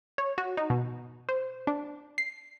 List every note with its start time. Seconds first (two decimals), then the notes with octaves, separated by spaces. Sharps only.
0.18 C#5
0.38 F#4
0.57 D#4
0.70 B2
1.29 C5
1.67 D4
2.18 C7